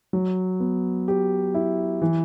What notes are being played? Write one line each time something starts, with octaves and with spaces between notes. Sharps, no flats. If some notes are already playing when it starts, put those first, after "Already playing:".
F#3
B3
G4
E4
E3